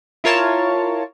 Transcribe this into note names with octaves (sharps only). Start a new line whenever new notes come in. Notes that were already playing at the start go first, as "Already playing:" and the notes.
E4 F4 A#4 C#5 A5